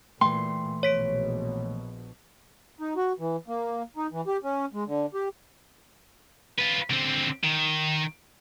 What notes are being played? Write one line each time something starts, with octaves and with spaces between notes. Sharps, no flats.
A#2 E3 A3 G5 C6
A#1 B2 C#5 B6 D7
D#4
F#4
E3
A#3
D#4
E3
G4
C#4
G#3
D3
G4
F4 B4
D3 C4
D#3